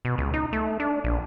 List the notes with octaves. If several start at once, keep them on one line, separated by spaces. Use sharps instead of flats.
B2
C#2
D#4
A3
D4
A#1